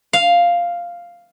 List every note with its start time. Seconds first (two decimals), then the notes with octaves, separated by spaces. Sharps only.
0.13 F5